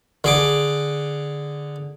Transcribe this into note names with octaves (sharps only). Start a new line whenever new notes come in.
D3 G#4 D6